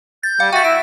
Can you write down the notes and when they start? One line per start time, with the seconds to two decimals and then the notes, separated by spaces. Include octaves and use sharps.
0.23 G6 A6
0.40 G3 F5
0.53 F#4 E5 G5 A6
0.64 E4 D7